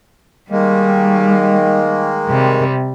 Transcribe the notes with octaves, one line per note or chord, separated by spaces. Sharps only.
D#3 G3 G#3 A#3
C3 G3